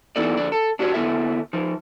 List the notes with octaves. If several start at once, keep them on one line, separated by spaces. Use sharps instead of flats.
E3 B3 D#4 E4 A4 D5
F2 D3 D5
A4
D4 F#4 G4 B4 C#5
D3 B3 E4 A4 E5
F3 D#4